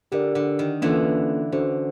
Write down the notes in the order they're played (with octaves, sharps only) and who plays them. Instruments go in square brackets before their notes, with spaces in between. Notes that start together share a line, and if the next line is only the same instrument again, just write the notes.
[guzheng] D3 [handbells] G4 A#4 D5
[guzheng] D3
D#3
[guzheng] D3 E3 [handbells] A#3 C#4 F4 A4
[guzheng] D3 [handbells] C#4 F#4 A4 C5